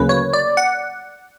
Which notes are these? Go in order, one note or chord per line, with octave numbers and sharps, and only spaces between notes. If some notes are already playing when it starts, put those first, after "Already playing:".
Already playing: D2 C#3 F#3 A#3 C#4 B4
C#5
D5
F#5